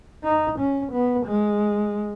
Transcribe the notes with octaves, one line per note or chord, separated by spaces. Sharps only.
D#4
C#4
B3
G#3